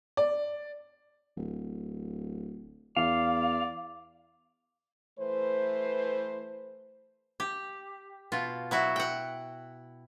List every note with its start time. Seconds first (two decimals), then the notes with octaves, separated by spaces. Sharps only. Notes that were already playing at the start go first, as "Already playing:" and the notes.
0.17 D5
1.37 D1
2.97 E2 D5 F5
5.19 E3 A3 B4 C5
7.40 G4
8.32 B2 F4
8.71 F#3 E4 F#4
8.96 F#5 G5